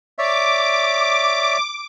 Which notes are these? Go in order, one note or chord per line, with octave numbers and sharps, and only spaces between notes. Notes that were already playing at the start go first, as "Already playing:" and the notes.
C#5 D5 E5 D6